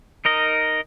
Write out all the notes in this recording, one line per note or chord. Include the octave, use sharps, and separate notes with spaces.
D#4 A#4 D#5